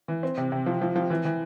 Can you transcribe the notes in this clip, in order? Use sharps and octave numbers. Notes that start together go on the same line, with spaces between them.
E3
C4
C3
C3
F3
F3
F3
E3
E3